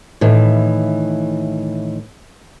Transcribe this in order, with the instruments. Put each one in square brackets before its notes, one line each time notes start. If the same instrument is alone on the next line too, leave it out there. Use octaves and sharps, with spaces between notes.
[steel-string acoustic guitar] A2 D#3 E3